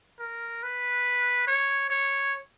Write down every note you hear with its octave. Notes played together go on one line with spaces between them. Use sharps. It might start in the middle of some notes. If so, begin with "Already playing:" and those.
A#4
B4
C#5
C#5